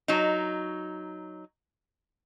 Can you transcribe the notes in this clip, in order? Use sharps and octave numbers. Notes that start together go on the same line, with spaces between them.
F#3 D#4